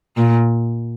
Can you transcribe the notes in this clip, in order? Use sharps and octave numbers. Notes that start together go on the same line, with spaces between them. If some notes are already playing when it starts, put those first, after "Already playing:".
A#2